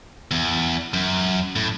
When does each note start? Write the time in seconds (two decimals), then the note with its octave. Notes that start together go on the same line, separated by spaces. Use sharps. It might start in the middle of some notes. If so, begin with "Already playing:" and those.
0.31 E2
0.94 F#2
1.56 A2